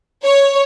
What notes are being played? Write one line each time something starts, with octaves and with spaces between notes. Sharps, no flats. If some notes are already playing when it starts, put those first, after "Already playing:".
C#5